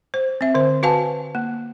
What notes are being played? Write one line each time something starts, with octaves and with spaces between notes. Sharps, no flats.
C5
C4 E5
D3 C5
F#4 B4 F5 G#5 A5
A#3